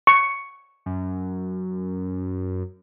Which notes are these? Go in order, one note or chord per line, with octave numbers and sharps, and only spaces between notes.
C#6
F#2